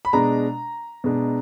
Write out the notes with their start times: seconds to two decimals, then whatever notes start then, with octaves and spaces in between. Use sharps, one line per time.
0.05 B5
0.13 B2 G#3 D4 A#5
1.04 B2 G#3 D4